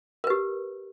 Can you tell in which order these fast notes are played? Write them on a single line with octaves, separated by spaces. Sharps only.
A#4 B4 G4